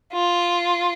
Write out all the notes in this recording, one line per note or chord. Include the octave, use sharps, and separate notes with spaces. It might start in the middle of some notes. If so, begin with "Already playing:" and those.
F4